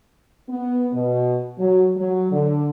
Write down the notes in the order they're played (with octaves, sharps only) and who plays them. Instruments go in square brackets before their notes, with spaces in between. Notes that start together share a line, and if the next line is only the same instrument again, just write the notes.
[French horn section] B3
B2
F#3
F#3
D3